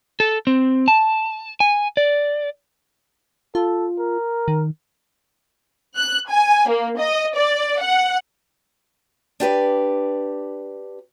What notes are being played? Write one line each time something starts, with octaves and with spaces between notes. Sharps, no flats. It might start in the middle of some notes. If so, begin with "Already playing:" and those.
A4
C4
A5
G#5
D5
F4 A4
A#4
D#3
F#6
G#5
A#3
D#5
D5
F#5
D4 G4 B4 D5